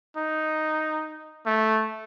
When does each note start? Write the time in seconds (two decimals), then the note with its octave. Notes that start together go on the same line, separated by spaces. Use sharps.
0.17 D#4
1.46 A3